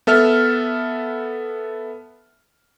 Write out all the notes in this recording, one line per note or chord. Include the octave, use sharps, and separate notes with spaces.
B3 A4 E5 F6